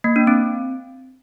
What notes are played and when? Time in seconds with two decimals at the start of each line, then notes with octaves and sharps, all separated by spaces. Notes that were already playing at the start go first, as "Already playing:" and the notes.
0.04 A#3
0.16 D4
0.27 C4